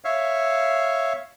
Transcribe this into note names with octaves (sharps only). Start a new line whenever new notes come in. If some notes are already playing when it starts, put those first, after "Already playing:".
C#5 E5 F5